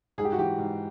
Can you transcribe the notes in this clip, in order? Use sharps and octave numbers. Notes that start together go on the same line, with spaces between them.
G#2 G#4
G4
F#4
E3 G4
G#2